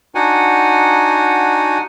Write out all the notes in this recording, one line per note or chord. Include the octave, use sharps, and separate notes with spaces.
D4 D#4 F#4 F#5 G#5